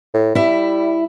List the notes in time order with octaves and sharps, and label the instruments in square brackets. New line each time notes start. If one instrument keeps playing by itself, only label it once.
[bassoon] A2
[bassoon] G3 [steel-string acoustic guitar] E4 E5